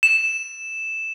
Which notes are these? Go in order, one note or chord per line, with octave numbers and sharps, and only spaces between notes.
E7